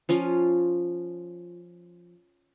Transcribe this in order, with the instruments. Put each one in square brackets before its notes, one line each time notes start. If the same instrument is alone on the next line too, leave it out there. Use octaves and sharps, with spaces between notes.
[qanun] F3 C#4 F4